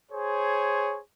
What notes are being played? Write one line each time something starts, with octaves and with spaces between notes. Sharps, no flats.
G#4 C5 C#5